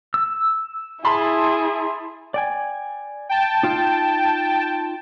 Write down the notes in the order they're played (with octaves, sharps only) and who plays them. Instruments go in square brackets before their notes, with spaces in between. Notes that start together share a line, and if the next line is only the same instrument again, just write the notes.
[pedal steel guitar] E6
[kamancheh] E4 G#4 [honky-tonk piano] A5 B5 C6
[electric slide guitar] D5 G5 G#5
[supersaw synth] G5 A5
[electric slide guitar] D#4 F4